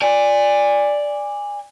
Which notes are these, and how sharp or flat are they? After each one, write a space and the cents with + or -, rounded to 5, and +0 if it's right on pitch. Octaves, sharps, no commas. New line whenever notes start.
D5 +0 G#5 -20